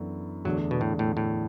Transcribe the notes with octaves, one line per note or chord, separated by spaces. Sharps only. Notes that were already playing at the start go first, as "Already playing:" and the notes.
Already playing: F#2 E3 B3 D4 A4
E2 D3 F#3 A3 D4
B2
A2
A2
A2